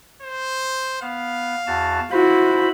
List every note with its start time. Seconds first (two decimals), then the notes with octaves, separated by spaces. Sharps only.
0.22 C5
1.02 B3 F5
1.67 E2 F#4 A5
2.11 E4 F#4 C5 B5